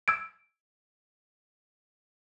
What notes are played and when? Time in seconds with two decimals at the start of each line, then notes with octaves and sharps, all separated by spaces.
0.08 E6 G#6 D7